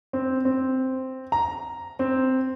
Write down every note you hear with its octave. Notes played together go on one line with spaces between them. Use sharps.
C4
C4
A#5
C4